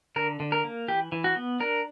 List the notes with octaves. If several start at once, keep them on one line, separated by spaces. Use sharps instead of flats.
D3 A#4
D3
A#4
A#3
E3 G4
E3
F#4
B3
D4 A#4